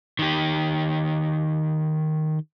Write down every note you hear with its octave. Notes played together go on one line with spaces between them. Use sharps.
D#3 G4